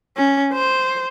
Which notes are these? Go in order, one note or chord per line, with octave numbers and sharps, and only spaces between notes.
C#4
C5